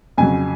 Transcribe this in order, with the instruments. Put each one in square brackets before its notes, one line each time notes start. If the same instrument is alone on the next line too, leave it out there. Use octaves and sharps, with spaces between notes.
[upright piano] F2 C#3 F#3 G#5